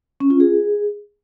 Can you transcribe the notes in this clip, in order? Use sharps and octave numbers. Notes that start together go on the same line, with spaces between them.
C#4
F4
G#4